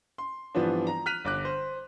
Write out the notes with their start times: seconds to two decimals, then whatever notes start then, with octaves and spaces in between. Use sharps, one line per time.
0.18 C6
0.55 G2 E3 F3 B3 C4 D4
0.87 A#5
1.06 F6 F#6 B6 D#7 F7
1.25 G1 D6 F#6
1.45 C5